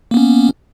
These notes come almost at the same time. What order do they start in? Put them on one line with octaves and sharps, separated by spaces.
A#3 B3 C#4